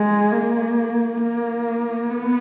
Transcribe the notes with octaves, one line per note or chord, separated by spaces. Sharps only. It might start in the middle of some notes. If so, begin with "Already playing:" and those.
Already playing: G#3
A#3
A#3
B3